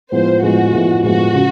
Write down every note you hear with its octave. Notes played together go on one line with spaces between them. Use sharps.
A2 F3 G#3 B3 C5
A2 F3 G#3 B3 F#4
A2 F3 G#3 B3
A2 F3 G#3 B3 F#4
C#3